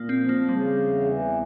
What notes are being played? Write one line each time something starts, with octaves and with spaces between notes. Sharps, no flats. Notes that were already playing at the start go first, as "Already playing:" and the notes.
Already playing: A#2 A#3
C4
F3
A#3
C#3 G3
E2
E3